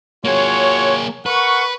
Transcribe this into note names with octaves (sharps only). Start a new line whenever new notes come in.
A#3 F4 F#4 G#4 C#5
A#4 B4 F#5 C#6